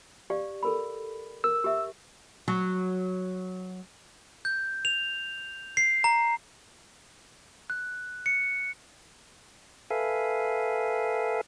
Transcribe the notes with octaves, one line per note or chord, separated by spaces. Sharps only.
G4 D5 F5
A4 A#4 B5
A#4 E6
G4 E5
F#3
G6
F7
C7
A#5
F#6
C#7
A4 B4 E5 F5 G#5